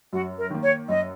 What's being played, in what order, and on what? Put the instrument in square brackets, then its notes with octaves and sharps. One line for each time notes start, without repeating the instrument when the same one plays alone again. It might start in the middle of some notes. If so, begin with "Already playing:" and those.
[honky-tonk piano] F#2 [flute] F#4
[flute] A#4
[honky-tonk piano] D#3 A#3
[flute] C#5
[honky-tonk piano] F#2 [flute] D#5